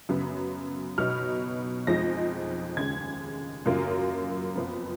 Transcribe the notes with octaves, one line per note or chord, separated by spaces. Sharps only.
F#2 C#3 F#3 B3
B2 F#3 B3 D#4 F6
F2 F3 G#3 D#4 A#6
D#2 C#3 G#3 G#6
F#2 C#3 F#3 A#3 F4
F2 F3 B3